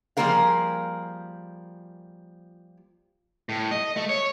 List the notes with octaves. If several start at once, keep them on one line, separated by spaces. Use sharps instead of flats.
F3 G3 A#3 G#4 A#4 F5
A2
D#5
A3
C#5